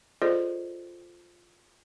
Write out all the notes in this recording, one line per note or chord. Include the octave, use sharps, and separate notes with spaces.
F4 G#4 A4 C5 D5 D#5